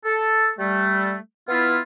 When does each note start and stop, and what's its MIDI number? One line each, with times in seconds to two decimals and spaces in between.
0.05 0.49 69
0.59 1.16 55
0.59 1.16 57
1.49 1.80 59
1.49 1.80 64
1.49 1.80 65